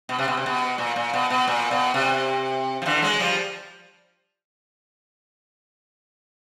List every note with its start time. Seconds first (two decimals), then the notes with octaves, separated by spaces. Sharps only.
0.09 B2
0.19 C3
0.28 B2
0.37 C3
0.46 B2
0.78 A#2
0.96 A#2
1.13 B2
1.30 B2
1.48 A#2
1.71 B2
1.94 C3
2.82 F3
2.86 D3 E3
3.02 F#3 G#3
3.19 F3 G3